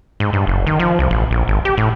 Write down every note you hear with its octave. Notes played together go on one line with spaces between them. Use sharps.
G#2
G2
F#1
D#3
F3
C2
A1
A#1
G#1
G4
A2